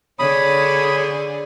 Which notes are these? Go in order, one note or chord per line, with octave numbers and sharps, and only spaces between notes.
D3 D4 G#4 C#5 B5 D#6